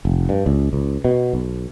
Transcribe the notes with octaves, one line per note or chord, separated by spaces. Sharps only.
F1
G2
C#2
C#2
B2
B1